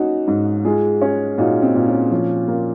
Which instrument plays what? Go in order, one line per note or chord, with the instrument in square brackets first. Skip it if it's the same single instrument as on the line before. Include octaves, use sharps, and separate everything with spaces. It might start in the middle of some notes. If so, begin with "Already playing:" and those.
Already playing: [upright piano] A#3 C#4 [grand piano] D#4 F#4
[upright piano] G#2
[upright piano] G#3 [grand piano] F4 G#4
[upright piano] C#4
[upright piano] A#2 [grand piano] D#4 F#4
[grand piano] C4 D#4
[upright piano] A#2
[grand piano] C#4 F4
[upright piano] F3 [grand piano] C#4 F4
[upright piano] A#3